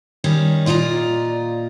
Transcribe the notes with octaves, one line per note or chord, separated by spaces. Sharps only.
D#3 G3 C#4
A#2 F4 D5 D#5 A#5